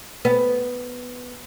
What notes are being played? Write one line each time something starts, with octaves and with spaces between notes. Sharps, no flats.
B3